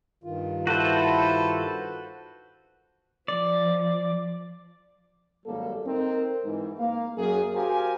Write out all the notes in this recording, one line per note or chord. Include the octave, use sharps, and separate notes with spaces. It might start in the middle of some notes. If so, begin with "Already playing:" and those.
G2 D#3 F4
E4 F#4 A4 B4 C5
F3 D5
G#1 F#2 G3 A#3 A4
C4 D#4 A#4
G#2 E3
A#3 F5
F#2 A#3 G#4
F#4 G4 A#4 C5 F5 G#5